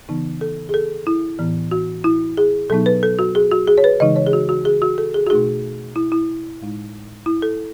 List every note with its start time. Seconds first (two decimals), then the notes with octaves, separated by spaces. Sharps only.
0.08 C#3 E3 B3 D#4
0.41 A4
0.69 G#4
0.74 A4
1.07 E4
1.39 A2 E3 B3
1.71 F#4
2.04 E4
2.37 G#4
2.69 B2 F#3 B3 D#4 A4
2.86 B4
3.03 A4
3.19 F#4
3.35 G#4
3.51 F#4
3.67 G#4
3.78 C#5
3.84 B4
4.00 C#3 E3 G#3 D#4 D#5
4.16 C#5
4.27 G#4
4.33 F#4
4.49 F#4
4.65 G#4
4.82 F#4
4.98 A4
5.14 G#4
5.27 F#4
5.30 B2 A3 D#4 G#4
5.96 E4
6.12 E4
6.61 A2 G#3 D#4
7.26 E4
7.42 A4